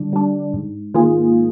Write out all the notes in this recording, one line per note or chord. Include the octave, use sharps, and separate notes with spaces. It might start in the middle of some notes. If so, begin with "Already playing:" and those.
Already playing: D3 G3 D4
G3 D4
G#2
D#3 A#3 F4 G#4